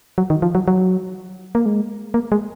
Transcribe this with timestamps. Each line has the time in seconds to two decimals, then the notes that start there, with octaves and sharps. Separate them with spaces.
0.18 F#3
0.30 D#3
0.42 F3
0.55 F#3
0.68 F#3
1.55 A#3
1.66 G#3
2.14 A#3
2.32 G#3